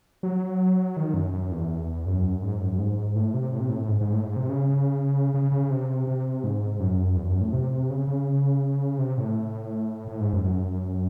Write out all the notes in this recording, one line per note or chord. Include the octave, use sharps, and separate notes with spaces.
F#3
D#3
F#2
F#2
E2
F#2
G#2
F#2
F#2
G#2
A2
C3
A2
C3
A2
G#2
G#2
A2
G#2
C3
C#3
C#3
C#3
C3
C3
G#2
F#2
E2
F#2
A2
C3
C#3
C#3
C3
A2
A2
G#2
F#2
F#2